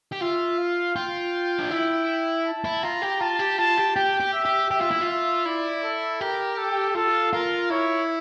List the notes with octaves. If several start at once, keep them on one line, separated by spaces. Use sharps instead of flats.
G4
F4 E5
F5
F4 G5
D4
E4
A5
E4
F4 A#5
G4
F4 A5
G4
F4 A5
G4
G4 G5
G4
E5
G4
G4 E5
F4
E4
F4
E5
E4 D5
A4
G4 A#4
A4
F4 A4
F4 A#4
E4 C#5